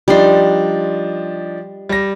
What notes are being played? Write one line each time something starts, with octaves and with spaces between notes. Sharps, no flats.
F3 G3 D4 D#4 C6
G3 A#6